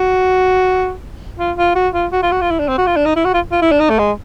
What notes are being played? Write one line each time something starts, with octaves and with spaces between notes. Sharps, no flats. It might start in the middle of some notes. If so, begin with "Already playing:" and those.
Already playing: F#4
F4
F4
F#4
F4
F#4
F4
F#4
F4
E4
D4
C4
F#4
F4
D4
D#4
E4
F#4
F4
F4
E4
D4
D#4
A3
G#3